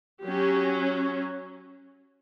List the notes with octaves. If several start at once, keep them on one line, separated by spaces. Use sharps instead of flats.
F#3 C#4 G4